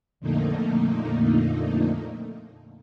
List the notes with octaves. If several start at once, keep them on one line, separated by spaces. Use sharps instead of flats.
F2 A#2 D3 A3 A#3 D#4